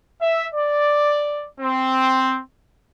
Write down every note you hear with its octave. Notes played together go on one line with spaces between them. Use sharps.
E5
D5
C4